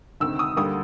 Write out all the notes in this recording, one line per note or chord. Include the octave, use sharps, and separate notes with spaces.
D2 C3 D#3 E6
D#6
D2 D3 G3 A#3 D#6